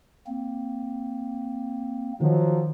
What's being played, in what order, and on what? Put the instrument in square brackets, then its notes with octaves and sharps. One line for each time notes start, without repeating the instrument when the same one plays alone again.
[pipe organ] A#3 C4
[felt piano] D#3 [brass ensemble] F3 F#3